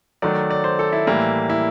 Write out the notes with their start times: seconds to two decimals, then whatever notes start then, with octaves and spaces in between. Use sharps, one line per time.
0.22 D#3 F#3 A3 D5
0.51 D5
0.64 C5
0.79 A4
0.92 E4
1.07 A2 E3 G3 A#3
1.50 E4